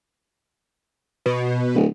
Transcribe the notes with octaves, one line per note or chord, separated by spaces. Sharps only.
B2
D1